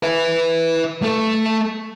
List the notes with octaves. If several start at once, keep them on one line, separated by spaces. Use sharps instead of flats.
B4 E5
A3 A4